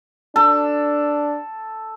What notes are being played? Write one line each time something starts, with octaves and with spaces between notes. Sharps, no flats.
D4 A4